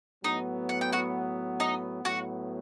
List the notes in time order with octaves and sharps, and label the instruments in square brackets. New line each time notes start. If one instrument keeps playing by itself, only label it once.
[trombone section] A2 F#3 B3 [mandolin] D#4 D#5
[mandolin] F#5
G5
F#4 F#5
D#4 D#5
[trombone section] A2 F#3 B3 [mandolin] F#4 F#5